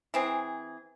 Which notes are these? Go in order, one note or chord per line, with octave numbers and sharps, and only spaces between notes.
E3 C4 G#4